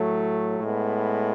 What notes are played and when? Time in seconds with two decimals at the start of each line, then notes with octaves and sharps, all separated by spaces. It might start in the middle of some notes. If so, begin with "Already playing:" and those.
Already playing: A2 F#3 A3
0.60 A2 G#3 B3